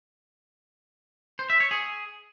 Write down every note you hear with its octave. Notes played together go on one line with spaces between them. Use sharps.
C5
E5
C#5
G#4